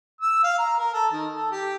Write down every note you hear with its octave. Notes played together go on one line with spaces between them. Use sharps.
E6
F5
A#5
A#4
A4
D#3
A4
G4